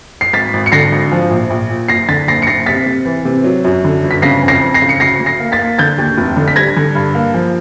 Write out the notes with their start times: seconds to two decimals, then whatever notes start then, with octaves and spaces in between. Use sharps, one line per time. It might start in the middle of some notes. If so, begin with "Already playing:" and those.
0.21 C7
0.33 G#1 A6 B6
0.53 G#1
0.66 C#7
0.72 D3 A#6 C7
0.92 G#1
1.12 F3
1.31 A#1
1.50 A#1
1.70 A#2
1.88 F#1 A#6 C7
2.08 D3 A6 B6
2.28 F#1 A#6 C7
2.42 C#7
2.47 F#1 A#6 C7
2.66 C3 A6 B6
2.86 C3
3.05 E3
3.25 C3
3.44 F#3
3.65 F#2
3.84 D3
4.04 G1
4.11 B6
4.22 C#3 A#6 C7
4.42 F2
4.48 A#6 C7
4.61 F2
4.74 A#6 C7
4.82 C#3
4.89 C#7
5.00 D2 A#6 C7
5.20 D2
5.26 A#6 C7
5.40 A#3
5.52 A6 B6
5.59 A#3
5.78 D3 G6 A6
5.98 D#2
6.18 F1
6.37 D3
6.48 B6
6.56 G3 G#6 A#6
6.77 D3
6.95 G2
7.15 A#3
7.34 F3